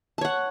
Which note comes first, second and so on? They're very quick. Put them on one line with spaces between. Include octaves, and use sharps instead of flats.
A5 C#5 F#5